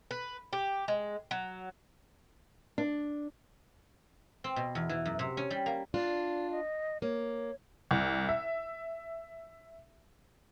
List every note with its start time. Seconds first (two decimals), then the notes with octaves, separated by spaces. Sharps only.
0.11 B4
0.53 G4
0.88 G#3
1.31 F#3
2.78 D4
4.44 C4
4.56 B2
4.75 E2
4.89 E3
5.05 F#2
5.19 C3
5.37 C#4
5.50 G3
5.66 A#3
5.94 D4 F4 D5
6.51 D#5
7.02 A#3 C#5
7.91 C2
8.29 E5